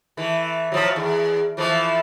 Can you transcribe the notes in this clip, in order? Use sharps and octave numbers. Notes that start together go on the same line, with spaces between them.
E3 A3
A2 F3 F#3
E2
E3 F3 A3